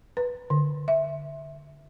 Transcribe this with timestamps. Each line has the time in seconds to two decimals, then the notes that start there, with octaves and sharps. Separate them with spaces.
0.17 B4
0.50 D3
0.88 E5